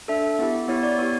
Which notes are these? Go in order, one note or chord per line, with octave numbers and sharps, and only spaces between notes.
D4 A4 E5
B3 E4 G4
B3 E4 G4 C#5
D5
B3 E4 G4 C#5